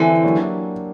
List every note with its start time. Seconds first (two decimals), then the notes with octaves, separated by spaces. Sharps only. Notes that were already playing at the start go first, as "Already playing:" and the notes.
Already playing: D3 E3 C4 E4 G4
0.24 F#3 A#3 D4 G4